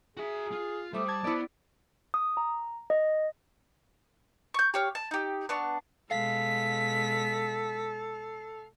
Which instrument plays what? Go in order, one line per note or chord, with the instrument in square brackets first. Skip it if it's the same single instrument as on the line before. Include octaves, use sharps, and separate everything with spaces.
[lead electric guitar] F#4 E5 [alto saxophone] G#4
[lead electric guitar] F4
[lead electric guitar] G3 [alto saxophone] A3 [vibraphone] C5 D6 D#6
[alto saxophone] A5 [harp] G#6
[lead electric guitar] B3 [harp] E4 D5
[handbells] D#6
A#5
D#5
[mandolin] C#6 G6
G4 C#5 F5
A5
D#4 G4
B3 D4 C#6
[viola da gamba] B2 G#3 [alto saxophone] A4 [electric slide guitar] F5 [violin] B6